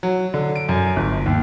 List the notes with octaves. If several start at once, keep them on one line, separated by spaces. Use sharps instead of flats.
F#3
D3
D7
F#2
G1
D#2